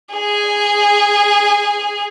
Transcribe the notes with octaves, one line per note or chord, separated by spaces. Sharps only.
G#4 G#5